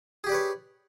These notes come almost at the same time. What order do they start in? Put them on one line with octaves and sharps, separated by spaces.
G#4 G4 D5 B4 C#5